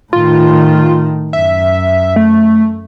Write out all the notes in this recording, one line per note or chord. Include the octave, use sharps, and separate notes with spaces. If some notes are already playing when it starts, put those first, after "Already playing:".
A2 D#3 F4
F#2 E5
A3